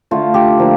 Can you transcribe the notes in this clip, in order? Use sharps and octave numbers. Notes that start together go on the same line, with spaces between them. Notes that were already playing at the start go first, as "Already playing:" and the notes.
D3 A3 F4
G4
D3 F3 A#3